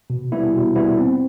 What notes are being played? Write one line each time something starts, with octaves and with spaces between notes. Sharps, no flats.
B2
G3 B3 E4
B2
G3 B3 E4
C4